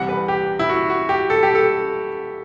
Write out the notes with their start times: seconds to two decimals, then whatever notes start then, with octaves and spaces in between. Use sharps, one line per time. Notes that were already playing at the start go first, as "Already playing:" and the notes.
Already playing: C2 C3 E3 G3 F#5
0.09 B4
0.28 G4
0.59 E4
0.69 F#4
0.90 F#4
1.09 G4
1.30 A4
1.43 G4
1.55 A4